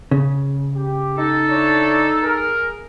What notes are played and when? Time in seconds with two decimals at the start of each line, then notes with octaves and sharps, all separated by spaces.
0.11 C#3
0.75 G4
1.17 D#4 A4
1.50 D4 E4 C#5
2.23 G#4 A#4